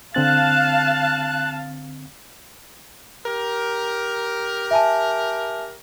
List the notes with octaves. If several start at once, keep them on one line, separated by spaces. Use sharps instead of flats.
D3 C4 F5 A5 F#6 A6
G4 A#4
E5 G#5 A5